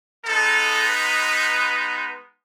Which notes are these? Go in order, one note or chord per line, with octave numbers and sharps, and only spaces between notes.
G#3 B3 D#4 A4
B4